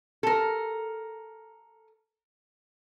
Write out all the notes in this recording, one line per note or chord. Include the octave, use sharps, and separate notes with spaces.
A4 A#4